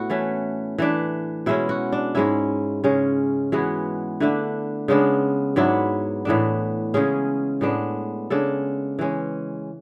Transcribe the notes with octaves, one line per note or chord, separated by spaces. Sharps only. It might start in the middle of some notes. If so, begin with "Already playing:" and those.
Already playing: A2 B3 E4 F#4
E3 A3 C#4
E3 A3 D4
B2 G#3 C#4 E4
F#4
D4
G#2 G#3 C#4 E4
C#3 G#3 C#4
E3 G#3 B3 F#4
D3 A3 D4 E4
C#3 G#3 B3 D4
G#2 F#3 B3 D4 E4
A2 E3 B3 D4
C#3 G#3 C#4 G#4
A2 G#3 B3 D4
C#3 G#3 D4 A4
E3 G#3 C#4